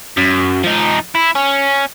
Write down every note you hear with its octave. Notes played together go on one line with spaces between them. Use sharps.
F#2
F3 D#4
E4
C#4